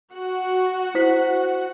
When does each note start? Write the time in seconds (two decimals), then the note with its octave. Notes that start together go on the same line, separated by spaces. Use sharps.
0.12 F#4 F#5
0.95 E4 C5 B6